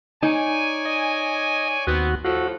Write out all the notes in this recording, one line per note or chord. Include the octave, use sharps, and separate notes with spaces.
D#4 C#5 D5 G#5
D#5
D#2 B3 C4 F#4
A2 F3 F#4 A4